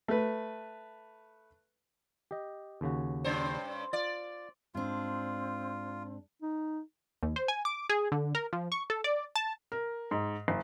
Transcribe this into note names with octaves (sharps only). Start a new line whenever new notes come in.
A3 B4
G4 D#5
D#2 C#3 F#4
G2 C#4 C5
F4 D5
G#2 C4 D4 F4
D#4
D#2
C5
G#5
D6
G#4
D3
A#4
F3
C#6
A4
D5
A5
A#4
G#2
F#1